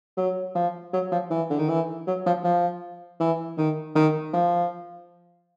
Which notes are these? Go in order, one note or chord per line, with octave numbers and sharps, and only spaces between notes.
F#3
F3
F#3
F3
E3
D3
D#3
E3
F#3
F3
F3
E3
D#3
D#3
F3